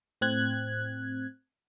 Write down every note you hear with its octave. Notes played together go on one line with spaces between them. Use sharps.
A2 C4 F#6 G#6